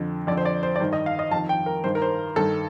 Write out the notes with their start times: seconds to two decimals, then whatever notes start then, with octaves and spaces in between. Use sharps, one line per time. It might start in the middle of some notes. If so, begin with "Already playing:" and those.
Already playing: F2 D3
0.27 F2 D3 D5
0.37 C5
0.45 D5
0.63 C5
0.76 D5
0.80 G2 D#3 C5
0.93 D#5
1.06 F5
1.19 D#5
1.31 F2 A5
1.36 D#3
1.49 G5
1.66 A#4
1.84 G2 D#3 C5
1.95 A#4
2.02 C5
2.36 G2 D#3 A4